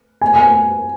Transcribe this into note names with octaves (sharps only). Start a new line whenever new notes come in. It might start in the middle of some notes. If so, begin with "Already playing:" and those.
G#5
G#5